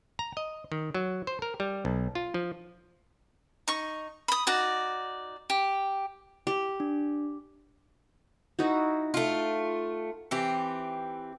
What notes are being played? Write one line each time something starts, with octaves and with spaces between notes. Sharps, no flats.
A#5
D#5
D#3
F#3
C5
A#4
G3
B1
F4
F3
D#4 C#6
B5 D#6
D#4 F#4 D5
G4
G4
D4
D#4 E4 F#4
A3 F4
E3 C4 G4